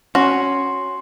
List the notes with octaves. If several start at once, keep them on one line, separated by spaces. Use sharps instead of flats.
C#4 F#4 C6